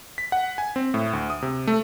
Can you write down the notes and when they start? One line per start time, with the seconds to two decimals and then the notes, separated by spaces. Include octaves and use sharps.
0.18 B6
0.32 F#5
0.58 G#5
0.76 C4
0.94 A2
1.13 D2
1.30 D#6
1.42 C3
1.67 A3